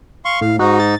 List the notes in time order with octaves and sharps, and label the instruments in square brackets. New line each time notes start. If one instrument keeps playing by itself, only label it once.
[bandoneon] F5 C6 C#6
[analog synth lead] A2 [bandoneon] F5
[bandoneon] G#2 D#4 [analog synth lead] F#4
[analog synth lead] A6